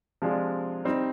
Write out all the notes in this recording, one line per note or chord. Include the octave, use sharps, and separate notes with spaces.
C3 F3 G#3 D4 F4
G3 C4 D#4